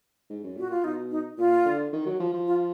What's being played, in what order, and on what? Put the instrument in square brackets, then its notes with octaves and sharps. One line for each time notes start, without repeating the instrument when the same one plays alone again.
[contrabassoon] G#2
F#2
[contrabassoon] A#2 [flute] F#4
[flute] F4
[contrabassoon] B2 [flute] D#4
[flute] D#4
[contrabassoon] A#2 [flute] F4
[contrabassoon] D3
D#3
F#3
F3
F3
[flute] F4